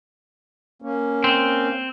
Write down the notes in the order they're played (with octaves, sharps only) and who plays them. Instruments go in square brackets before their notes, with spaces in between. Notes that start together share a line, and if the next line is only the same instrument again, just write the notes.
[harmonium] A#3 C#4
[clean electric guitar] C4